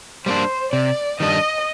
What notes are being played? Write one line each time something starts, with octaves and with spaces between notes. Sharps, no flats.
G3 A#3 D4 C5
C3 D5
D#3 G3 D4 D#5